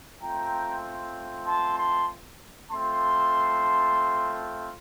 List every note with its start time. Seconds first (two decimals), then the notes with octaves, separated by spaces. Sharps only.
0.20 A3 C4 F4 G5 A#5
1.46 A5 C6
1.77 A5 C6
2.71 A3 C4 F4 A5 C6